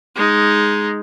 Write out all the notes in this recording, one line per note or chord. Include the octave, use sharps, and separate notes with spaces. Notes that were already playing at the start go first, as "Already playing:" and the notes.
G#3 D#4